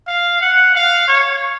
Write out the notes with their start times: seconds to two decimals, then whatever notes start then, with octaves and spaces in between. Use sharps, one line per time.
0.08 F5
0.41 F#5
0.75 F5
1.07 C#5